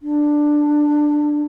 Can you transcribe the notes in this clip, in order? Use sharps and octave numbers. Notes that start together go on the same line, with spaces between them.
D4